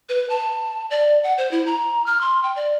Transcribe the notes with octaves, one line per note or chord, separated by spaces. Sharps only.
B4
A5
D5
F#5
C5
E4
A#5
F6
C6
G5
D5